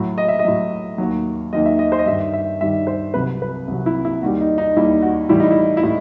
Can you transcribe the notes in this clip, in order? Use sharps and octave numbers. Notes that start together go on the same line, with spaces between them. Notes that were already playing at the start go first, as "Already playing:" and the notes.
Already playing: A2 F#3
D#5
E5
D#5
A2 F#3
D#2 D#3 F#3
D#2 D#3 F#3 D#5
E5
D#5
C5
D#5
G2 D#3 G3 E5
E5
G2 D#3 G3 E5
C5
C2 C3 F#3 B4
B4
C2 C3 F#3
E4
E4
D#2 D#3 G3 F#4
D#4
D#4
D#2 D#3 G3 E4
F#4
A2 E3 G3 E4
D#4
E4
E4
A2 D#4